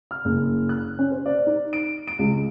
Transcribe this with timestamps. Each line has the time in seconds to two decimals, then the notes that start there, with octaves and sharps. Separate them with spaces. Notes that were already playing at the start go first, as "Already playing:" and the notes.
0.11 F6
0.25 F#1
0.69 F#6
0.99 C#4
1.10 C5
1.26 D5
1.47 D#4
1.73 D7
2.07 D7
2.19 C#2